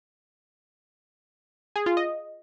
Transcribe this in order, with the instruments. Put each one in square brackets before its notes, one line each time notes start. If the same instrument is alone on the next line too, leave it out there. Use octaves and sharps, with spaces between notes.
[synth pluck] G#4
F4
D#5